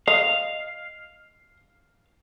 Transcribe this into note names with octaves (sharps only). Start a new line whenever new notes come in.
D#5 F5